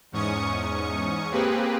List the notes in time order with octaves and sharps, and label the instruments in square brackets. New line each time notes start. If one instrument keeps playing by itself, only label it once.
[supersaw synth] E2 G#2 C#4 C#6 D#6 C#7
A#3 C4 G4 G#4 B4